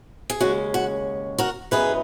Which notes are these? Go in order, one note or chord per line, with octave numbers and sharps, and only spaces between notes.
G#4
D#2 C#3 G#3 C#4 F#4
F#4
F#4 A#4
F#2 E3 B3 D#4 G#4 B4